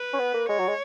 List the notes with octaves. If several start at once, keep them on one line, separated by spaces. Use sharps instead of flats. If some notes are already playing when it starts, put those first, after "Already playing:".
Already playing: B4
C#4
B3
A#3
G#3 C#5
F#3
G#3